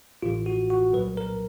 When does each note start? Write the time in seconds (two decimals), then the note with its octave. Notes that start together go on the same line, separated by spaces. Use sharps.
0.22 A1 A2 E3 F4
0.46 F#4
0.70 F#4
0.93 C2 A#2 F#3 B4
1.17 A#4